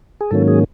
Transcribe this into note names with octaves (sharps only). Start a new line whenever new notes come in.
G#4
G#2 D#3 F#3 A#3 C#4 A4
G#4